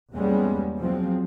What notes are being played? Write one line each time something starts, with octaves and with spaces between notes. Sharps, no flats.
E2 G3 G#3 A#3 B3 C#4
F3 F#3 G#3 C4